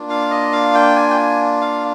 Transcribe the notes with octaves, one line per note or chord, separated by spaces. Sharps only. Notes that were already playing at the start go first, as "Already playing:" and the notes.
Already playing: A#3 D4 F4
F5
D#5
F5
G5
G#5
G5
G#5
F5